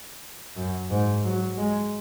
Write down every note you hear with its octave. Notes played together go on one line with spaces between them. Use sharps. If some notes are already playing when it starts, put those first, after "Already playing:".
F#2
G#2
F#3
G#3